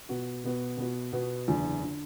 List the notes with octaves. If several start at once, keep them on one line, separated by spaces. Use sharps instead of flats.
B2 B3 F#4
B2 B3 F#4
B2 B3 F#4
B2 B3 F#4
F#1 E2 D3
D3